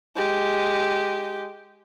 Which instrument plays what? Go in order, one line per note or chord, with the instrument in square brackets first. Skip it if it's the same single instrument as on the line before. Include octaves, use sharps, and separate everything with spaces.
[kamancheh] G#3 G4